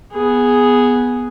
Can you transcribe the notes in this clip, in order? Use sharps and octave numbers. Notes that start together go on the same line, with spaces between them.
B3 G#4